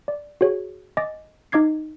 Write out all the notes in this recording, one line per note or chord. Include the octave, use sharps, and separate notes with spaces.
D5
F#4 G#4 C#5
D#5 G#5 D6 A6 A#6
D#4 D#5 D6 G#6 C7